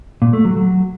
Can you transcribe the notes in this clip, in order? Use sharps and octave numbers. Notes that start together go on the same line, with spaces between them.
A#2
A3
F#3
F#3